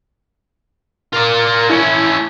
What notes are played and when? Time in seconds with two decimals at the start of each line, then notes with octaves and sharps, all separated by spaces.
1.13 F4 A#4 D5
1.70 A3 C#4 E4